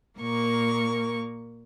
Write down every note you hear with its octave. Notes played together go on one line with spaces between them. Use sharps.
A#2 A#3 A#4 C#6